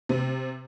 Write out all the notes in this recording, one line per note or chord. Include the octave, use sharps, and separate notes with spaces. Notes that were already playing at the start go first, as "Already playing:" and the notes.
C3